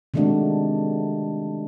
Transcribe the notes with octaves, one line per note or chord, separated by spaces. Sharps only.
C3 D#3 G#3 A3 D4 F#4